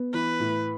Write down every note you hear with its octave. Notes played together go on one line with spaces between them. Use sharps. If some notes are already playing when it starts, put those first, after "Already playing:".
Already playing: B3
E3 B4
A2